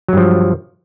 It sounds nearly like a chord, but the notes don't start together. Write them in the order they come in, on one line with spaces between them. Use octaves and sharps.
F#3 G2 F3